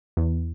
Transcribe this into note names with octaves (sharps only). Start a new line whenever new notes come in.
E2